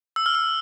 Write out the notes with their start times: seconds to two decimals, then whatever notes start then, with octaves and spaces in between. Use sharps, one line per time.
0.16 E6
0.26 F6
0.35 E6